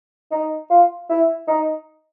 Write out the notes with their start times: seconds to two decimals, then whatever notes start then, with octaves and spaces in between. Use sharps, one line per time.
0.31 D#4
0.70 F4
1.09 E4
1.48 D#4